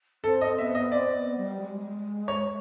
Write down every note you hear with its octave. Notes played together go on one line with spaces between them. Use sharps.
C4 A4
D#5
B3 E5
D#5
C4 D5
B3
G3
G#3
C#5